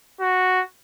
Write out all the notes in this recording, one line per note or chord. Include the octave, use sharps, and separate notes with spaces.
F#4